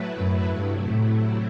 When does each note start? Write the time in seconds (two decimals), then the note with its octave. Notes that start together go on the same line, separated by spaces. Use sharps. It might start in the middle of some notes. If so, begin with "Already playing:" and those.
Already playing: A2 F#3 A3 E4 B4
0.19 F#2
0.53 G2 C3 F#3 A3 E4
0.87 A2